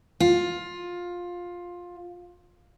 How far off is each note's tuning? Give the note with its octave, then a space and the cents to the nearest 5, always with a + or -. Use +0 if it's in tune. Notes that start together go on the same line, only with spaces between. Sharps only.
F4 +15